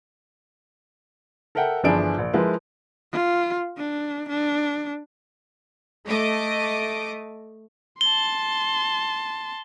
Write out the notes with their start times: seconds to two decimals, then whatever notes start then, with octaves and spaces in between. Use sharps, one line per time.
1.55 A4 A#4 E5 F#5 G5
1.84 G1 E3 F3 D4 G#4 D7
2.18 A#1
2.33 F3 G#3 E4 A#4 B4
3.13 F4
3.77 D4
4.29 D4
6.05 A3 D#5 D6
8.01 A5 C6 G7